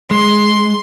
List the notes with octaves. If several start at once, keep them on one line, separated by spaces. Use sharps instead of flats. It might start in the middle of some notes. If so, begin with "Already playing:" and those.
G#3 C6